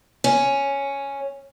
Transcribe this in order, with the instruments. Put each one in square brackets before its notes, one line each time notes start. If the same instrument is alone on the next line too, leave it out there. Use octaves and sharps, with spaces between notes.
[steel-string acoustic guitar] C#4